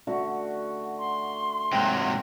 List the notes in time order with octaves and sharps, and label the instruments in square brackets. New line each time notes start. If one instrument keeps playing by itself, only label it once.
[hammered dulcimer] D3 A3 F#4
[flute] C6
[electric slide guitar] G#2 C3 F#3 [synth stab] G5 G6